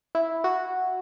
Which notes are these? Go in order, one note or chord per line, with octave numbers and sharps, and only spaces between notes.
E4
F#4